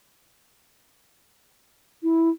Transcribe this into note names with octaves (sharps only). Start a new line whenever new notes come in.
E4